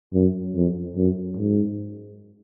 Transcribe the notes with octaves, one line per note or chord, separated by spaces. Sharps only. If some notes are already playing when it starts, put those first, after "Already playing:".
F#2
F2
F#2
G#2